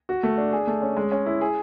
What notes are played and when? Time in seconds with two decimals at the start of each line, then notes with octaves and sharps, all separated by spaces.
0.09 F#4
0.23 A3
0.38 D4
0.53 G#4
0.67 A3
0.82 C#4
0.97 G#3
1.12 C#4
1.26 E4
1.41 G#4